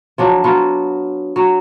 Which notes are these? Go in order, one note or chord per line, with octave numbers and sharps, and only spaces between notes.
F3 F#3 D4
F#3 B3 F4
F#3